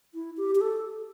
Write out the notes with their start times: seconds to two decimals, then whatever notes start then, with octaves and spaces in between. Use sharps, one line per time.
0.14 E4
0.37 G4
0.55 G4
0.61 A4